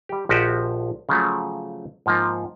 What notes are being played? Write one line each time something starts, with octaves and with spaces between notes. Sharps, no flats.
G3 G4
A#1 F3 F#4 G4 D#5 E5
C#3 F3 F#3 A3
G#2 F3 A#3